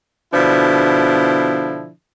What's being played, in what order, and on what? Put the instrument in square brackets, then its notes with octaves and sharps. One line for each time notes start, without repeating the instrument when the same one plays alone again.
[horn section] B2 D3 F3 D4 E4